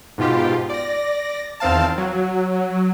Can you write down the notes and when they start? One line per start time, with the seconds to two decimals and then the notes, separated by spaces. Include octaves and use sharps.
0.18 G#2 B2 F4 G4
0.69 D5 A#6
1.60 E2 D#3 C4 F5 A5
1.98 F#3